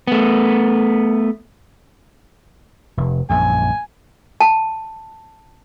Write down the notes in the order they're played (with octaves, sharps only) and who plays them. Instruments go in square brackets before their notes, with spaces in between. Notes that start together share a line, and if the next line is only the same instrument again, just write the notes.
[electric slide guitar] A3 B3
[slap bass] F1
[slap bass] A#1 F#2 [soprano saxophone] G#5
[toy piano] A5